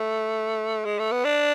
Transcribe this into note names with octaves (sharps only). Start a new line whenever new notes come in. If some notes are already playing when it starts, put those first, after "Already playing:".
Already playing: A3
G#3
A3
B3
D4